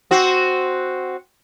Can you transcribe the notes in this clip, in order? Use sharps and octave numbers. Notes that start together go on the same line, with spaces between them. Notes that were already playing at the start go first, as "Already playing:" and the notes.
C4 F#4